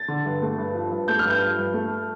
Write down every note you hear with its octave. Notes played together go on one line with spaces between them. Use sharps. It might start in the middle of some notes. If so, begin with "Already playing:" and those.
Already playing: A6
D3
G2
A3
G2
F3
G2
A3 G6
F6
G2
G6
F3
G2
A3